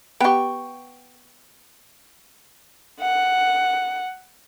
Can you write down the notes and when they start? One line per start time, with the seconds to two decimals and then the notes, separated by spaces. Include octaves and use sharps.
0.20 B3 G4 G5 C#6
3.01 F#5